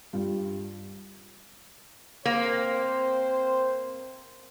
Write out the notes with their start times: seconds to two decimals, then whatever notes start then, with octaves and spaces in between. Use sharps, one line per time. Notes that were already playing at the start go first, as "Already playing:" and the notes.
0.13 G2 F4
2.26 A#3 C4 C5